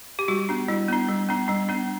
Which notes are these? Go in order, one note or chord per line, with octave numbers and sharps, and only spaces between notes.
G4
G3 F#4
B3 D4
G3 E4
B3 D4
G3
B3 D4
G3 D4
B3 D4